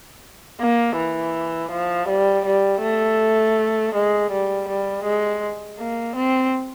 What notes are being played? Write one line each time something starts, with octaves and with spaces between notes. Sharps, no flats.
A#3
E3
F3
G3
G3
A3
G#3
G3
G3
G#3
A#3
C4